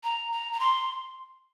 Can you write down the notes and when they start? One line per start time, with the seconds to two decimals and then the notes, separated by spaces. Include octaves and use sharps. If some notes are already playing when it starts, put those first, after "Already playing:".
0.04 A#5
0.32 A#5
0.52 A#5
0.60 C6